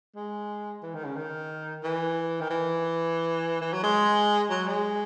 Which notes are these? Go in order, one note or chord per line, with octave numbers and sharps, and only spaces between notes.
G#3
E3
D#3
C#3
D#3
E3
D#3
E3
E3
F#3
G#3
F#3
G#3